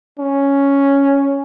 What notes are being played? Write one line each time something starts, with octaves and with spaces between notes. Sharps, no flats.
C#4